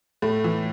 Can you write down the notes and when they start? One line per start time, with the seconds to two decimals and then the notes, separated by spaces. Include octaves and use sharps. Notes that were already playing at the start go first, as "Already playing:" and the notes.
0.22 A2 A3
0.44 E3